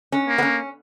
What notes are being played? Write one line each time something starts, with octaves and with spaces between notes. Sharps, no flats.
C#4
A#3
B3
C#4